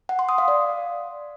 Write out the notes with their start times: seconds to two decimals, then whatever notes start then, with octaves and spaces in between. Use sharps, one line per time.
0.09 F#5
0.19 C6
0.29 D#6
0.38 F5
0.48 D5